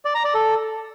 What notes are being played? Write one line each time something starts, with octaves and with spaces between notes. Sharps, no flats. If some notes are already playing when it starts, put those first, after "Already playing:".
D5
A#5
D5
A4